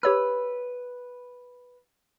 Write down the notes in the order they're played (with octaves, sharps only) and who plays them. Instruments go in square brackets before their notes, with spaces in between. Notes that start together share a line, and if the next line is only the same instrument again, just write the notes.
[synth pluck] G4 C#5 E6 [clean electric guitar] B4